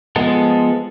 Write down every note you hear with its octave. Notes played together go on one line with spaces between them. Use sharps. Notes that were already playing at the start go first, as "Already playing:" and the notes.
F3 G#3 B3 A4